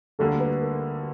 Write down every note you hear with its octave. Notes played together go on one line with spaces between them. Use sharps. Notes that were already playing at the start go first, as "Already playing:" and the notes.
D2 D3 G3 A#3 A4
B4
A#4